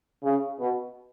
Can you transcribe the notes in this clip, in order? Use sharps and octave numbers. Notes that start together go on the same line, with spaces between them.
C#3
B2